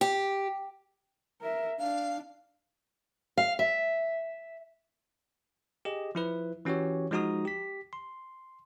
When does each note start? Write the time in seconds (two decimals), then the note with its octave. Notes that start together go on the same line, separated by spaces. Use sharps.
0.01 G4
1.42 A#4 E5
1.79 D4 F5
3.37 F5
3.59 E5
5.85 G4 G#4 D#5
6.15 F3 E4 B4
6.65 E3 C#4 F#4 G4 C#5
7.11 F3 G#3 D#4 F#4 A#5 D#6
7.45 G4 B6
7.93 C6